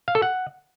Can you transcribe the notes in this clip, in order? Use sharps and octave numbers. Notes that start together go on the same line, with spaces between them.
F5
A4
F#5